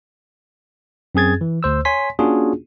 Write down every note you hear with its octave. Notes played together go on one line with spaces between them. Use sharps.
F#2 C4 G#4 G#6 A6
E3
D2 C5 E6
C#5 G#5 C6 B6
A#3 C#4 D4 F4 F#4 G#4